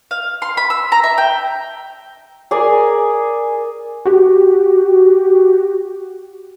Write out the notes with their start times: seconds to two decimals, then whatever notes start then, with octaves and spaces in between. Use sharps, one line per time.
0.11 F5
0.42 C6
0.57 B5
0.70 E6
0.92 A#5
1.04 E5
1.18 G5
2.51 G#4 A#4 D5 G#5
4.06 F#4 G4